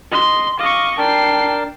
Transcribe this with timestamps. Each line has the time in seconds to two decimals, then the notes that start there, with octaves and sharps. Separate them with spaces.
0.12 D#5 C6
0.59 D#5 F5 C#6 D6
0.98 D4 A#4 G5 A5 C7